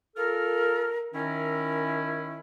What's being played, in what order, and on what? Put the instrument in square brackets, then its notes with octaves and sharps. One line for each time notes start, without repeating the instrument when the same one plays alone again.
[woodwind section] F4 A4 F6 [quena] A#4
[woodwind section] D#3 C#4 E4 [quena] A#4